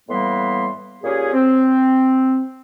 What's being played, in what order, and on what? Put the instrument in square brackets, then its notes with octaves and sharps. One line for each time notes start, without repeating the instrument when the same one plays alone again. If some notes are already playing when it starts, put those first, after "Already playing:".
[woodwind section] A2 E3 G3 A#3 B3 C6
A#2 C#4 G4 G#4
C4